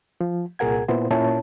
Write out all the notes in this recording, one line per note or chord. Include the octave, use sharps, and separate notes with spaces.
F3
C2 A#2 G#4 A#4 F#5 G#6
A#2 B3 E4 C5
A#2 C#4 E4 C#5 A5